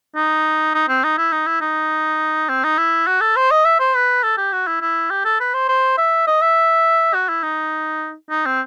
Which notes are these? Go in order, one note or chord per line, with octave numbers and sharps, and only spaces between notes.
D#4
D#4
C4
D#4
E4
D#4
E4
D#4
C4
D#4
E4
F#4
A4
C5
D#5
E5
C5
B4
A4
G4
F#4
E4
E4
G4
A4
B4
C5
C5
E5
D#5
E5
F#4
E4
D#4
D#4
C4